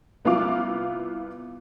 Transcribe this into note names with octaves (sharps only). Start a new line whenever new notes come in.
C2 B3 E4 F4 F5 D6